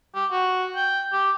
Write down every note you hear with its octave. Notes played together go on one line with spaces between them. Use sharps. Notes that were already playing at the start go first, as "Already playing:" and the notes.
G4
F#4
G5
G4